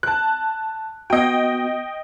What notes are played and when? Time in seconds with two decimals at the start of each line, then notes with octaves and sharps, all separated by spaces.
0.03 A5 F#6
1.10 B3 F#4 D#5 G5